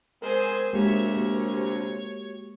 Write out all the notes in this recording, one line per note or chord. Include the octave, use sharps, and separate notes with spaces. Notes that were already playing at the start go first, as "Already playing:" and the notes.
G#3 B3 C4 A#4 C5 G#5
D2 C3 G#3 A#3 F#4 G4 C#5 E5
A#3 C#5